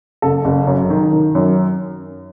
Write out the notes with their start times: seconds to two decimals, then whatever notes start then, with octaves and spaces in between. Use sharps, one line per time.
0.22 F#1 A4
0.45 F#1
0.67 F#2
0.90 D#3
1.13 D#3
1.35 F#2